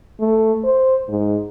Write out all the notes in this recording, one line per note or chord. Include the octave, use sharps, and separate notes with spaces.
A3
C5
G#2